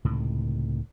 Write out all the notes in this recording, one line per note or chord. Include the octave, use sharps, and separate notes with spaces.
C#2 A2 C3 D#3